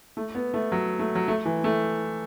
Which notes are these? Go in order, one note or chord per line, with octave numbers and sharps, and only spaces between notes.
A3
B3
A3
F#3
A3
F#3
A3
E3
A3